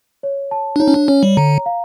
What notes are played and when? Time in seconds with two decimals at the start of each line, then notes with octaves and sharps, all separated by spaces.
0.23 C#5
0.51 A5
0.76 D4
0.80 D#4 C#5
0.88 C#4
0.94 D4
1.08 C#4 C#5
1.23 G3
1.37 D3 A#5
1.66 F5